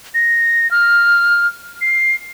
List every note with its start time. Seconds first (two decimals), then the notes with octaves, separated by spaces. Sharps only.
0.14 A#6
0.71 F6
1.81 C7